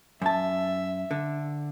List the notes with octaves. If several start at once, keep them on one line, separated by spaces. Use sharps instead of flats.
F#2 E5 A5
D3